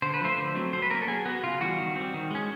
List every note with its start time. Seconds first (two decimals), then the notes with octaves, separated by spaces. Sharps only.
0.02 D3 C5
0.14 B4
0.21 F3 A3 C5
0.38 D3
0.55 F#3 A3 C4
0.73 F#3 C5
0.82 B4
0.91 A#3 C#4 A#4
1.02 A4
1.08 F#3 G#4
1.26 B3 F#4
1.44 C#3 F4
1.61 E3 G3 F#4
1.78 D#3
1.96 G3 C4
2.14 D#3
2.31 G#3 C#4